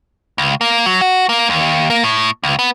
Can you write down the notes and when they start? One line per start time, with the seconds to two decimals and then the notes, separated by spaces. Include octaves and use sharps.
0.38 C#2
0.61 A#3
0.86 F#3
1.01 F#4
1.29 A#3
1.50 D#2
1.90 A#3
2.04 A2
2.43 C#2
2.59 B3